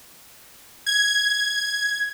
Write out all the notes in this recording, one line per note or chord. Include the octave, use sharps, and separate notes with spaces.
G#6